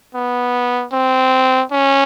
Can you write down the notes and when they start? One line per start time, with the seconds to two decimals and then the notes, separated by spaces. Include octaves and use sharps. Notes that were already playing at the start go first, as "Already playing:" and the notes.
0.15 B3
0.93 C4
1.72 C#4